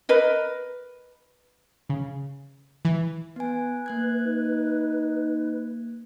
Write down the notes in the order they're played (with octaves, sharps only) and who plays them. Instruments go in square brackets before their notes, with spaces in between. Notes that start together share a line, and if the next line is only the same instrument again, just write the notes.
[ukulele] A#4 B4 D#5
[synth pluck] C#3
E3
[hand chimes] B3 G#5 [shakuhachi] B4
[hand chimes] A#3 F#6 G#6
[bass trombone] D#4